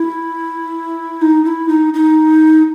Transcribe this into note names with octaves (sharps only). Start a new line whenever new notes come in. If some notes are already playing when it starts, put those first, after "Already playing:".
Already playing: E4
D#4
E4
D#4
D#4